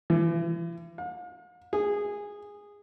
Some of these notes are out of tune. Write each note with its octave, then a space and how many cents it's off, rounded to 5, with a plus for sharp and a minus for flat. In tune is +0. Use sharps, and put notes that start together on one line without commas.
E3 +40
F5 +45
G#4 -15